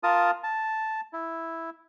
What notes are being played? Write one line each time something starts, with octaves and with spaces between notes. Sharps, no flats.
F4 A#4 A5 D#6
A5
E4